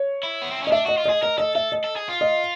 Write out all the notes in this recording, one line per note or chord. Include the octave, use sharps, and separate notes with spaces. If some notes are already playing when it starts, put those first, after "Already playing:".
Already playing: C#5
E4
B3
C4
C#4
D#5
D4 E5
F#4 D#5
F4
G#4 D#5
A#4 D#5
A4 D#5
A4 E5
D#5
A4
G#4
F4
D#5